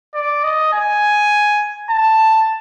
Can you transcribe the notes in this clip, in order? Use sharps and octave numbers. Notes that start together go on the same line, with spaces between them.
D5
D#5
G#5
A5